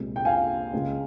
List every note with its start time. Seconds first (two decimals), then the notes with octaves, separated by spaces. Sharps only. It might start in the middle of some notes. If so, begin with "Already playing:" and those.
Already playing: C2 A#2 G#3 C4
0.16 G5
0.25 F5 G#5
0.73 C#2 C#3 G#3